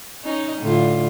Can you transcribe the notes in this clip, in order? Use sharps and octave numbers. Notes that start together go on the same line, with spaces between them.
C#4 D#4
A2 D3 F4